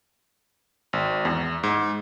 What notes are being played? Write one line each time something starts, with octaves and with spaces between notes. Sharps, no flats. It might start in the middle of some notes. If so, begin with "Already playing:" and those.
G#1
E2
G#2